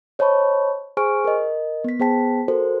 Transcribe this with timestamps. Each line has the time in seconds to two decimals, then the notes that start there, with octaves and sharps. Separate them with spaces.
0.19 C5 C#5 D#5 A5 B5 C#6
0.97 G#4 C5 G#5 C#6 F6 D7
1.25 A#4 D#5
1.84 B3 B6
2.00 B3 G#4 C5 G5 A5 B6
2.48 F#4 A4 A#4 C5